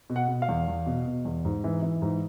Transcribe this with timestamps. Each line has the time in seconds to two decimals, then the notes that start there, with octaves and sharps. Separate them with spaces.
0.10 B2
0.16 F#5
0.28 B2
0.42 F5
0.48 E2
0.68 E2
0.86 B2
1.05 B2
1.25 E2
1.45 G#2
1.64 E3
1.82 E3
2.02 G#2